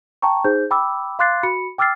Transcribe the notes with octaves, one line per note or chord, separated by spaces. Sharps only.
G5 A5 A#5 C#6
D#4 G#4 C5 G6
G5 B5 D6 E6
F5 C6 D6 F#6 A6 C7
F#4 B5 C#7
G5 D6 E6 F6 A6 C7